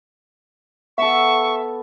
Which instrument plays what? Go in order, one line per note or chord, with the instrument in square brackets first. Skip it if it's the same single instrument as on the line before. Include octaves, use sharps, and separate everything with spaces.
[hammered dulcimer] B3 A4 [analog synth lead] E5 [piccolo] C#6